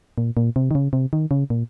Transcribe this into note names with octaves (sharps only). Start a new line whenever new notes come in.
A#2
A#2
C3
D#3
C#3
C3
D#3
C#3
A#2